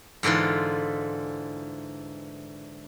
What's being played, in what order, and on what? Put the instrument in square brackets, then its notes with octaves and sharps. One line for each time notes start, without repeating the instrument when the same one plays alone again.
[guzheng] G#2 D3 E3 F4 C6